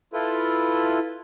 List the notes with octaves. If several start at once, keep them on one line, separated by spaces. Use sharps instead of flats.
E4 F4 A4 B4